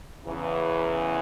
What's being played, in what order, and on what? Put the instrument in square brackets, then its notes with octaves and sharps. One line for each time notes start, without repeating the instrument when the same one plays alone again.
[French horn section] E2 C#3 E3